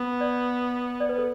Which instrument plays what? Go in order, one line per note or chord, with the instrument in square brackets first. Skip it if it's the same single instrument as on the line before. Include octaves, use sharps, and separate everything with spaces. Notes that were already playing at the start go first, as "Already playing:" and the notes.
Already playing: [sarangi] B3
[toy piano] D5
D5
B4
A4